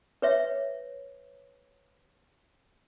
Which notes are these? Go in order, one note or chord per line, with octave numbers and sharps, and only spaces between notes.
B4 C#5 E5